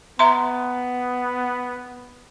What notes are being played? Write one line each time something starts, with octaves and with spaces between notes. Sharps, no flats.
B3 E5 A#5 C6